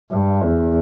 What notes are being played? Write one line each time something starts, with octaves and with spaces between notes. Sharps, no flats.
G2
E2